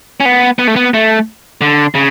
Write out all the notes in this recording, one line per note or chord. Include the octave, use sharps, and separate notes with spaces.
C#4
B3
B3
A3
B3
A3
D3
C#3